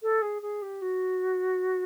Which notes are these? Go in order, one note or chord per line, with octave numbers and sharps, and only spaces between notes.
A4
G#4
G#4
G4
F#4